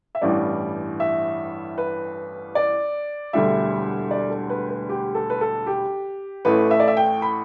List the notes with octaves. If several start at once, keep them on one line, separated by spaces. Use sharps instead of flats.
E5
A1 G2 E3 G3 D5
E5
B4
D5
E1 D2 D3 G3 E5
D5
A4
B4
B4
G4
A4
B4
A4
G4
A1 A2 A3 B4
E5
D5
E5
G5
B5